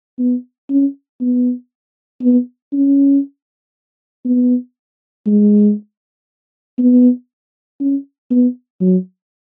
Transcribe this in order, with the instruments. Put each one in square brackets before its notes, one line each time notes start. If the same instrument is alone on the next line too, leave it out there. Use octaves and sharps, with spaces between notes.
[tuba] B3
C#4
B3
B3
C#4
B3
G#3
B3
C#4
B3
F#3